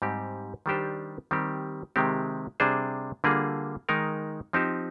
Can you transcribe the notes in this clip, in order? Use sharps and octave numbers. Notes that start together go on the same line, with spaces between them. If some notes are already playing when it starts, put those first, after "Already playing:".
G#2 G3 C4 G4
D#3 G3 D4 G4 C5
D#3 G3 C4 G4
C3 D#3 G#3 C4 G4
C3 G3 D4 G#4 C5
D3 G3 A#3 F4 G#4
D#3 G#3 D#4 A#4
F3 C4 D#4 G4 C5